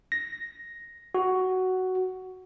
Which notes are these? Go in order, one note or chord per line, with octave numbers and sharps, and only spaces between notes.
A#6
F#4